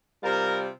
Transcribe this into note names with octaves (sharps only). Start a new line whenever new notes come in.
C3 G3 C4 F4 A#4